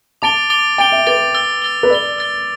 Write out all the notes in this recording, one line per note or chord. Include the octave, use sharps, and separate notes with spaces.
A5 D6 A6 D7 G7
D6 A6 D7 G7
G5 D6 A6 D7 G7
E5
B4 D6 A6 D7 G7
E6 A6 G7
E6 A6 G7
B4
D5 E6 A6 G7
E6 A6 G7